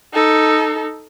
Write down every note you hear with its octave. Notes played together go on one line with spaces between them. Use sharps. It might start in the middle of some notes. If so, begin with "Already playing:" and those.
D#4 A4